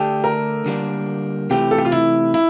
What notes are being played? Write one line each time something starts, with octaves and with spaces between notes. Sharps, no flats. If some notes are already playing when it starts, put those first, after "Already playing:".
Already playing: D3 A3 D4 G4 A4
A#4
D3 G3 A#3 D4
C3 E3 A3 G4
A4
G4
F4
E4
E4